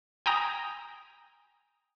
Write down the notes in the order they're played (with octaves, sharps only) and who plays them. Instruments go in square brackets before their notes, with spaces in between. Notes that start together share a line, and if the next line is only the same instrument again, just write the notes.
[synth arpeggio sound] G5 G#5 A#5 D#6